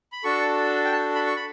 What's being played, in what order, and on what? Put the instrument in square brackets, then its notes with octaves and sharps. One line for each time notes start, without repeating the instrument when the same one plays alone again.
[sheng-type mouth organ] B5
D4 F#4 A4 C#6
G5
A5
B5
C#6
B5